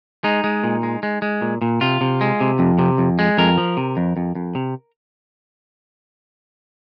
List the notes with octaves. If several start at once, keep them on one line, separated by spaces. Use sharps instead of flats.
G#3 D#4
G#3
A#2
G#3
G#3
G#3
A#2
A#2
C3 F4
C3
G#3
C3
F2
C3
F2
G#3
F2 A#4
F3
C3
F2
F2
F2
C3